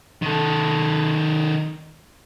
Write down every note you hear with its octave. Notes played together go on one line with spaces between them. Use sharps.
D#3 A4